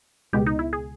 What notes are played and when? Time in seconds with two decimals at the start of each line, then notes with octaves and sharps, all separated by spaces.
0.33 C#2 B2 G#3 B3 G4
0.46 D#4
0.59 E4
0.73 G#4